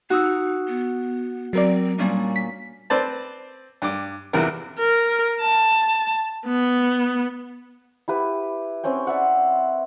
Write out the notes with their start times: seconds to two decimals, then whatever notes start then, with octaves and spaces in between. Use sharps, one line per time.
0.10 D#4 F#4 D#6 E6
0.68 B3
1.53 F#3 C4 A#4 D5
1.98 A#2 G3 C#4 D4
2.36 B6
2.90 C4 B4 C5 D5 A5
3.82 G2 D6
4.33 A#1 E2 C3 E3 A#4
4.78 A#4
5.41 A5
6.46 B3
8.08 E4 G4 B4
8.83 C4 C#4 C#5 G5
9.07 D5 E5 F#5